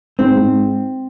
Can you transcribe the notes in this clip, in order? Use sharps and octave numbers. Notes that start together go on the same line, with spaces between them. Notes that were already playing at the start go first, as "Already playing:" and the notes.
G#2 C4
G#2